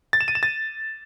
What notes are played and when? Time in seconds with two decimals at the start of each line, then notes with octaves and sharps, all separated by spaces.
0.13 A6
0.21 E7
0.28 D#7
0.35 E7
0.43 A6